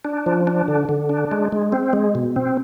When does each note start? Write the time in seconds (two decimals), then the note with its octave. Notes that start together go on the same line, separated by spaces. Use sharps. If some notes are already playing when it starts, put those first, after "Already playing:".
0.05 D4
0.26 F3
0.47 D4
0.68 D3
0.89 D3
1.09 D4
1.31 G#3
1.52 G#3
1.72 C4
1.93 G#3
2.15 B2
2.36 C4